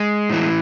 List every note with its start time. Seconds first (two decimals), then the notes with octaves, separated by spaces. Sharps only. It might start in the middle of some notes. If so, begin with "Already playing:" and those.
Already playing: G#3
0.30 A2 E3